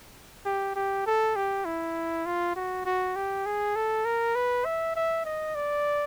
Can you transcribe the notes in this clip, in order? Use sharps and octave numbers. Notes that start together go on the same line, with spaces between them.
G4
G4
A4
G4
E4
F4
F#4
F#4
G4
G#4
A4
A#4
B4
E5
E5
D#5
D5